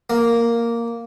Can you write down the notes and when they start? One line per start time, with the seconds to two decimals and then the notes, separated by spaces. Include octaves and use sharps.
0.10 A#3